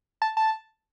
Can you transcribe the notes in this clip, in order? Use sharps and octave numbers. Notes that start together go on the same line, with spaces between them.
A5
A5